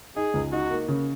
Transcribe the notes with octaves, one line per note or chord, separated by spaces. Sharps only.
D#4 G#4
C#2
D#4 F#4
A#3
C#3